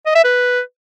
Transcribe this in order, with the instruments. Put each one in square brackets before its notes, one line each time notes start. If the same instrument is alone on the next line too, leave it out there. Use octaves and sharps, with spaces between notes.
[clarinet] D#5
E5
B4